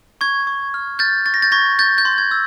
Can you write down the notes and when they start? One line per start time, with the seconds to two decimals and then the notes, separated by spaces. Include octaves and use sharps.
0.21 C#6 G#6
0.47 C#6
0.74 F6
0.99 F6 G6 A6
1.26 C#6 A6
1.34 A#6
1.42 G6 A6
1.52 C#6 G#6 A#6
1.79 G6 A6
1.98 G6
2.05 C6
2.18 G#6
2.31 E6